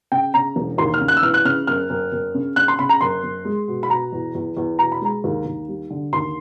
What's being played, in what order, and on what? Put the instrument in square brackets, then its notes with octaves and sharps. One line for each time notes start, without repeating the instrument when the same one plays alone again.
[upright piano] C#3 G5
C#3 A#5
E1
D#2 C6
F6
C#3
F#6
E6
E3 F6
F#6
C#3 F6
F#1 F6
F#1
F#1
C#3
C#3 F#6
C6
C#3 B5
A#5
F#1 C6
F#1
G#3
B2
B5
B2 A#5
E2
E2
E2
B2 A#5
B5
G#3 A#5
D#2
D#2
G3
D3
D#2 C6